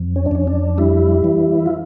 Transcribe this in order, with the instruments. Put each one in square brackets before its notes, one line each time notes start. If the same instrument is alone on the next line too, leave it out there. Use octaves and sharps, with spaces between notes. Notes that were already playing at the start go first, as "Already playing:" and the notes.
Already playing: [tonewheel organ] F2
C#4
D4
F2 C#4
D4
G3 E4
E3
F4